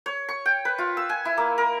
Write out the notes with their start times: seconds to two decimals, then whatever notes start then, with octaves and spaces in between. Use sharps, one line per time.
0.06 C#5
0.29 C#6
0.46 G5
0.65 B4
0.78 F4
0.97 E6
1.09 G#5
1.25 E4
1.37 A#3
1.58 A#4